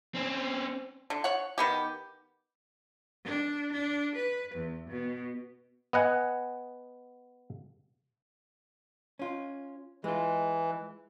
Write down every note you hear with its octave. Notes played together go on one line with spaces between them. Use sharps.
C4 C#4
D3
C#5 F#5
D#3 B3 G4
D4
D4
B4
E2
B2
B3 D#5 F#5 G#5
C#4 F4
E3 G#3 F4